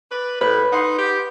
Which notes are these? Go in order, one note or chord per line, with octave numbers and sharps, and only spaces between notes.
B4 D5
A2 B4
D#4 F#5 C6
G4